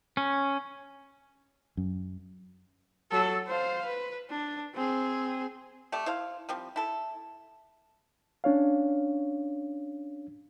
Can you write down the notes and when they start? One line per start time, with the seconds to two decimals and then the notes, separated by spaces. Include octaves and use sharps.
0.17 C#4
1.77 F#2
3.11 F#3 A4
3.47 C5 F5
3.85 B4
4.30 D4
4.74 C4 G#4
5.92 A3 G4 D5
6.06 E4 C5 F5
6.49 F3 G3 C4
6.76 E4 A4
8.44 C#4 D4 C#5 F5